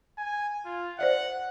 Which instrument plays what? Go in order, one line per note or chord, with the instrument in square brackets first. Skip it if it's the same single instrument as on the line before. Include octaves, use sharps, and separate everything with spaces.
[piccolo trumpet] G#5
F4
[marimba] C5 D5 E5 [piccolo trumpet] F#5